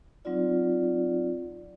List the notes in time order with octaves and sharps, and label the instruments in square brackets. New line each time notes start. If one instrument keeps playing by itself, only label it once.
[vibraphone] F#3 C4 D#4 F4 D5